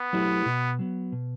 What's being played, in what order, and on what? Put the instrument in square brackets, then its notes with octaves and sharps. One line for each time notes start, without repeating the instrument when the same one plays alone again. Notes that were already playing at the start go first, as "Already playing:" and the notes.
Already playing: [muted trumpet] B3
[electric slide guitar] F#3 A3 E4 G4
B2
F#3 B3
B2